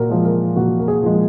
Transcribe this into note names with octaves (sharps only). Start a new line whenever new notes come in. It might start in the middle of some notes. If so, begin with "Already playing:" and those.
Already playing: A#2 F#4 A#4
F3 G#3
A#4
A#2 F#4
A#4
G#4
F3 G#3